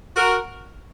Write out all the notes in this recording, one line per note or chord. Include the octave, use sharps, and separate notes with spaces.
F#4 A#4